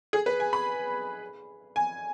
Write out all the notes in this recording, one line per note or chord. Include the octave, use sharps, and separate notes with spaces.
G#4
B4
G#5
B5
G#5